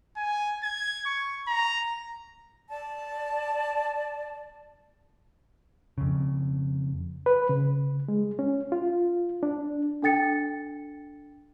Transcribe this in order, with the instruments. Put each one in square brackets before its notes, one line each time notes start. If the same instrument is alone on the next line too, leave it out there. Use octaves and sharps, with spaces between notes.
[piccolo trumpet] G#5
G#6
C#6
A#5
[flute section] D5 A5
[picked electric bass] F2 C#3
[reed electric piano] B4
C#3
G#3
C#4
F4
D4
[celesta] D4 A4 G5 A6 C#7